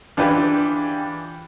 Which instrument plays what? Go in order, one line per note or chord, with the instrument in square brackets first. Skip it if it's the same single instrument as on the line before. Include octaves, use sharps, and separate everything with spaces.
[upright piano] E3 D4 F4 G4 G#4 B4